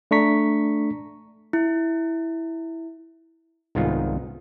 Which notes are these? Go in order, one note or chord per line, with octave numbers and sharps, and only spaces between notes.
A3 D4 A#5 C#6 B6
E4
C2 G#2 D#3 B3 F4